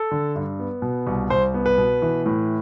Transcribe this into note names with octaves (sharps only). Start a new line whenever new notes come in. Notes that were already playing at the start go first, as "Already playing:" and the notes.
Already playing: A4
D3
G2
B3
B2
C2
C2 C5
B3
B4
B2
E3
A2